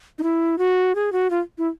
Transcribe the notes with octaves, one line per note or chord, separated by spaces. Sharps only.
D#4
E4
F#4
G#4
F#4
F4
E4